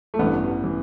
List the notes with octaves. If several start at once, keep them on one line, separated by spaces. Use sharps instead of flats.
A3
A1 G2 E3 B3
E3